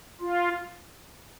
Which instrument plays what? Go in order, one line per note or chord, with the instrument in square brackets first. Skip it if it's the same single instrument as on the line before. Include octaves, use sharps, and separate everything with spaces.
[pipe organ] F4